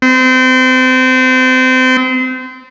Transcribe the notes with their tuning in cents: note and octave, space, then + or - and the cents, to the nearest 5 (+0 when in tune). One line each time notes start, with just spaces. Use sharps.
C4 -30